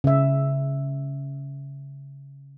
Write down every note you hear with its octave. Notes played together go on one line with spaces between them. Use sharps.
C#3 E5